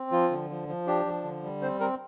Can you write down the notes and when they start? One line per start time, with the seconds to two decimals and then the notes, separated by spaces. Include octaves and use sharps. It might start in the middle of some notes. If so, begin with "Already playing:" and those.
Already playing: C4
0.12 F3 F4
0.31 D3
0.50 F3
0.68 F3
0.87 D4 G4
1.05 F3
1.24 D3
1.43 G3
1.61 C4 C5
1.80 C4 A#4